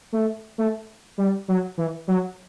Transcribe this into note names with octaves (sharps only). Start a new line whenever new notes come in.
A3
A3
G3
F#3
E3
F#3